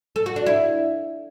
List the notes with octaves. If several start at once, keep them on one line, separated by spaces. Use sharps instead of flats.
A4
F#4
D4
E4